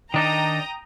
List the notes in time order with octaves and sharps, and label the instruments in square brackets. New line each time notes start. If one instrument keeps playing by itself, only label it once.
[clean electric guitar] D#3 D4 D#4 [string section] G5 A#5 D#6